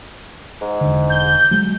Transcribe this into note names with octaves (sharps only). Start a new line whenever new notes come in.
G#2
E1 D3
G6
F#3 G#3